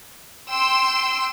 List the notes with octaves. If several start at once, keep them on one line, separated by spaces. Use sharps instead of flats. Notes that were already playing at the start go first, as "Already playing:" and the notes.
G5 C6 E6